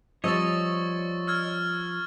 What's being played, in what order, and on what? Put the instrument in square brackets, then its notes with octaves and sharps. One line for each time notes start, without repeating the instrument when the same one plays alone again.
[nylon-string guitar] F3 G3 C4 [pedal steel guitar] C#5 D#5 [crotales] C#6 E6 A6
[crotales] E6 F6 G#6